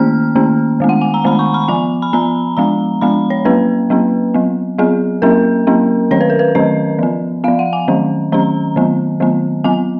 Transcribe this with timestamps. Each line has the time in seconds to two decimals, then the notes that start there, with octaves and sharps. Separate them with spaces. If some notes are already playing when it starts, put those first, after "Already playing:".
Already playing: D#3 A#3 C#4 F6
0.36 D#3 A#3 C#4
0.80 D#3 G#3 B3
0.89 F#5
1.01 G#5
1.14 A#5
1.24 D#3 G#3 B3 B5
1.39 C#6
1.54 B5
1.68 F3 B3 G#5
2.02 B5
2.13 F3 B3 A#5
2.57 F3 G#3 B3 A#5
3.01 F3 G#3 B3 B5
3.30 C#5
3.45 F#3 A#3 C#4 B4
3.90 F#3 A#3 C#4
4.34 F#3 B3
4.78 F#3 B3 G#4
5.22 F#3 A#3 C#4 A#4
5.67 F#3 A#3 C#4
6.11 D#3 F#3 C#4 C#5
6.21 B4
6.30 A#4
6.39 B4
6.55 D#3 F#3 C#4 D#5
6.99 F3 B3
7.44 B3 F5
7.48 F3
7.59 F#5
7.73 G#5
7.88 D#3 F#3 C#4
8.32 D#3 F#3 C#4 A#5
8.76 D#3 F#3 B3
9.20 D#3 F#3 B3
9.64 F#3 B3 G#5